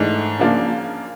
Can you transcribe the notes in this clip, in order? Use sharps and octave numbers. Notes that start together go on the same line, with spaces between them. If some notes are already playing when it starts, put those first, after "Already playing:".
Already playing: G#2 E3 A3 D4
C#3 F3 A#3 D4 F4